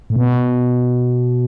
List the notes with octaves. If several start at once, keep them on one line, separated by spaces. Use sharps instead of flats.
A2
B2